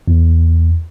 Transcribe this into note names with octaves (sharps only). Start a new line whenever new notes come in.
E2